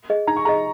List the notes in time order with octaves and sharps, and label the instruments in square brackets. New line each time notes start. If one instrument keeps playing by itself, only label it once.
[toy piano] G#4 D#5
[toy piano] D#4 [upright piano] A#5
[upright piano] C#6
[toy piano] G#4 D#5 [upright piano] A#5